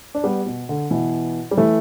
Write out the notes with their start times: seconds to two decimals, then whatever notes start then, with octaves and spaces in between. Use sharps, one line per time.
0.15 D4
0.24 G3 B3
0.46 B2
0.69 D3
0.91 B2 E3
1.51 G3
1.57 E3 A3